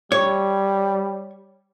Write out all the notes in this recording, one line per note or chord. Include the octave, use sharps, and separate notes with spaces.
G3 C#5